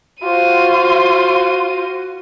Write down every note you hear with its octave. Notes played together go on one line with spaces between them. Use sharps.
F4 F#4 C5 D#7